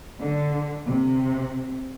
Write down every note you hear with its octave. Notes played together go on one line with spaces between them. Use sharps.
D3
C3